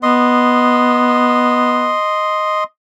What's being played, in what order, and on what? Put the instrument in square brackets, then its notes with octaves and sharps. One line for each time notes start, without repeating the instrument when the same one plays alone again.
[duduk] B3 [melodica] D#5 C6